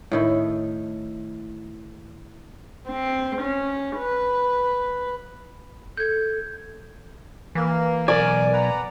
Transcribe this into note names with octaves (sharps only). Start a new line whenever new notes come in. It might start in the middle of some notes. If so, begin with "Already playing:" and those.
A2 D#3 E4
C4
C#4
B4
A4 G6 G#6
E3 A#3
B1 A#4 D5 G#5
B4 F#5 A#5